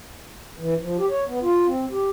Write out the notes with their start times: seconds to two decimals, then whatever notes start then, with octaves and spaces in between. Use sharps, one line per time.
0.59 E3
0.81 F3
0.98 G4
1.10 C#5
1.27 B3
1.42 F4
1.66 C4
1.91 G4